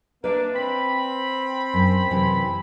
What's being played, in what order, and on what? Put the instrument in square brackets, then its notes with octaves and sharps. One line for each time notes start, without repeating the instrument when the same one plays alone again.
[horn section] A#3 D4 [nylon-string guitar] B4 E5
[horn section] C4 B5
[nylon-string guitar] F#2
F#2 C3 E3